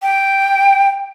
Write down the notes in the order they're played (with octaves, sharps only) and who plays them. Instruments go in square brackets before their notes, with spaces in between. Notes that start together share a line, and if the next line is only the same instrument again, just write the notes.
[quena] G5